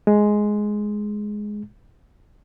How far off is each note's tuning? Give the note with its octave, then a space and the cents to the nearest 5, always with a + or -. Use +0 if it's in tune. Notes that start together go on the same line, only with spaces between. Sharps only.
G#3 +5